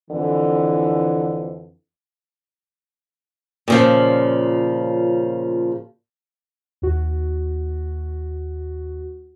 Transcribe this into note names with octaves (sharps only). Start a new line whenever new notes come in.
F2 D3 E3
A#2 C#3 F3
D#2 F#4